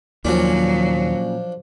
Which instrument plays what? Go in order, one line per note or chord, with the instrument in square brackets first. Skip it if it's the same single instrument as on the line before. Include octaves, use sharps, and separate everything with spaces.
[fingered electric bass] D#2 D#3 [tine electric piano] A#2 C#4 [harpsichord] F3 D4 [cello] F#3